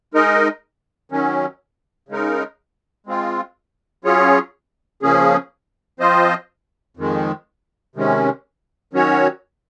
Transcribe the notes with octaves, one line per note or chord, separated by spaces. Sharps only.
G#3 D#4 A#4 D#5
D#3 F#3 C#4
C#3 G#3 D#4 A#4
G#3 C4 F4
F#3 C#4 F4 G#4 C#5
C#3 F3 A#3 C#4 G#4
F3 C4 F4 C5 D#5
F2 D#3 G#3
C3 D#3 G#3 C#4
D#3 F#3 C#4 F#4 C#5